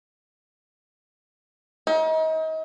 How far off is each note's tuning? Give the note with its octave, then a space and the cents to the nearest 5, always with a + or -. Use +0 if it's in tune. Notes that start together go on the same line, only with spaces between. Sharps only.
D#4 +35